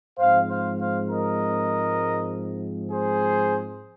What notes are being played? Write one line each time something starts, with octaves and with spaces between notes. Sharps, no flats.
G#2 F3 G#3 C4 C5 F5
C5 F5
C5 F5
A#4 D#5
G#4 C5